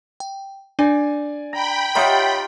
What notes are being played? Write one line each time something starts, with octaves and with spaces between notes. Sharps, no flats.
G5
D4 D5 G#5
G5 A#5 B5
D#4 F4 G4 C#5 E5 F#5 A#5 D#6